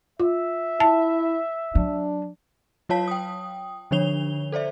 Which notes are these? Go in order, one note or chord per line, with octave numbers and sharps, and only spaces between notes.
F4 E5
E4 A5
F#3 D4
F#3 F4 C#5 F5 A5 B6
G5 D#6
D3 F3 D4 C#5 F7 G7
A4 C5 D5 E5